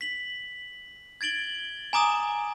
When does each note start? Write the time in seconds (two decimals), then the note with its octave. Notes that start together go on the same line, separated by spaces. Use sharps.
0.01 B6 F#7
1.21 G#6 A6 D7 F#7 G7
1.93 G#5 A#5 D6 D#6 E7